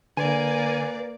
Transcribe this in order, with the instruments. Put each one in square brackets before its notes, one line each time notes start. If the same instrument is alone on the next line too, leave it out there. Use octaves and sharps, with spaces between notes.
[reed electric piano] D3 [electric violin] A#3 D5 [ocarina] B4 [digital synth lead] G#5